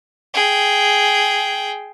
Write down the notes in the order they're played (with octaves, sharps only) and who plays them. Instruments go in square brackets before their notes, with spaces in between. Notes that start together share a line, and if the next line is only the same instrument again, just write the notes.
[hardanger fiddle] G#4 G5